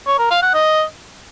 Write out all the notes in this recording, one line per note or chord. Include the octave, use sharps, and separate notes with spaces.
C#5
A#4
F5
F#5
D#5